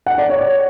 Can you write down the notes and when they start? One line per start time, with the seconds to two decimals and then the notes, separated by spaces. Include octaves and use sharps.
0.06 F#5
0.18 D5
0.30 C#5